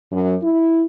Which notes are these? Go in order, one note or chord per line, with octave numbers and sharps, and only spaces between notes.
F#2
E4